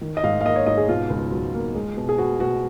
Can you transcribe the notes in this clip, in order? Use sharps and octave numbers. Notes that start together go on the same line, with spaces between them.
D#3
D#5
G#2 F5
F5
A#3 D#5
C#5
G#2 D#5
G#4
B2 F4
C#2
F#3
A#3
G#3
B2
G#4
B3 F#4
B2 F#4